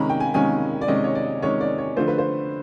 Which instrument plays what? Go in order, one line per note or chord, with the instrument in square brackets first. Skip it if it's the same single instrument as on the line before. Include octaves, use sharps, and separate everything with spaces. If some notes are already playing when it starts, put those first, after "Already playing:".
Already playing: [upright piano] C3 D#3 G#3 C#4 A#5 B5
G5
G#5
C3 D#3 G#3 C#4 G#5
D5
C3 D#3 G#3 C#4 D#5
C#5
D5
C3 D#3 G#3 C#4 C#5
D5
C#5
D3 F3 A3 C5
B4
C5